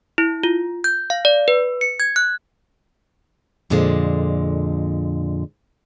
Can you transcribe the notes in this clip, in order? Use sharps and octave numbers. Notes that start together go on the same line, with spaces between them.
E4
F4
G6
F5
D5
B4
C#7
G#6
F#6
F2 A#2 D3 G#3